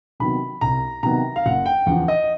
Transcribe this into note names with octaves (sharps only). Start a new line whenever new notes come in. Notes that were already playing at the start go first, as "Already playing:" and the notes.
C3 D#3 F#3 B3 B5
C2 A#5
C3 D#3 F#3 B3 A#5
F5
F#1 F#5
G5
E2 C#3 F3 F#5
D#5